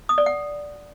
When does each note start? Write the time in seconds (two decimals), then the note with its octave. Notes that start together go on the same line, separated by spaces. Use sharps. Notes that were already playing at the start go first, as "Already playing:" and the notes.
0.09 D#6
0.18 D5
0.26 F#5